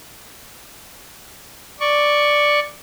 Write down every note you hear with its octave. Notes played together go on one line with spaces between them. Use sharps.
D5 C#6